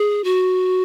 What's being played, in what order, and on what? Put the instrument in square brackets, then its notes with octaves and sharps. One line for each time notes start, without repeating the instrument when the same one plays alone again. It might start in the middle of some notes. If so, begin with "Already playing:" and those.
Already playing: [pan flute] G#4
F#4